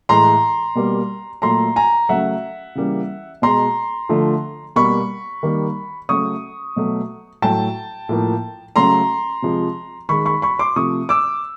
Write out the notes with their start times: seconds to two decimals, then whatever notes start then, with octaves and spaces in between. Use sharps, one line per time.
0.09 A2 E3 G#3 A#5 C6
0.75 B2 G3 A#3
1.42 A#2 F#3 A3 A#5 C6
1.76 G#5 A#5
2.09 C#3 F#3 A3 E5 F#5
2.75 C#3 E3 G3 A#3
3.42 B2 G#3 A#5 C6
4.09 D3 F3 A3
4.76 B2 G3 A#3 B5 C#6
5.43 D#3 G3 A#3
6.09 C#3 F#3 A3 C#6 D#6
6.76 B2 F#3 A3
7.42 A2 F#3 A3 G5 A5
8.09 A2 F3 A#3
8.76 C#3 F#3 A3 A#5 C6
9.42 C3 F3 G#3
10.09 D#3 G#3 B5 C#6
10.26 B5 C#6
10.42 B5 C#6
10.59 C6 D6
10.76 C3 F3 A3 C#6 D#6
11.09 D6 E6